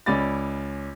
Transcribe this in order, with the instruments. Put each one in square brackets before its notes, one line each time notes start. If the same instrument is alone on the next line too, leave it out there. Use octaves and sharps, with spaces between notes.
[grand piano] C#2 C#4 D5 B5 D6 A6